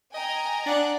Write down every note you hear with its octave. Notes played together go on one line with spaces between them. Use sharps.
D#5 G5 G#5 A#5
D4 D5 F#5